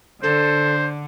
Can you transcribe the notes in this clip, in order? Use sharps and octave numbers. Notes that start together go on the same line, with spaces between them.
D3 A4 C5